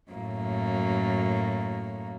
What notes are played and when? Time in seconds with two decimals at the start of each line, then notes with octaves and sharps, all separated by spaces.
0.11 F#2 A2 A#3